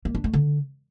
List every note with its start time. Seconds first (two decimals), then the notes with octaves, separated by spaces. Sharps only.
0.05 A#3
0.15 D4
0.24 A3
0.33 D3